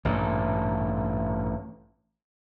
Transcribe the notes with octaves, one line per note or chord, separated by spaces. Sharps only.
A1 G2 A#2